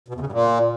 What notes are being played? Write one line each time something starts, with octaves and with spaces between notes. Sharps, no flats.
B2
E2
C#3
G2
A#2